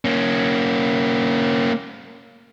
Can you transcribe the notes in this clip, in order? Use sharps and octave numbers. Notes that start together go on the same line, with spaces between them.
A#3 C#4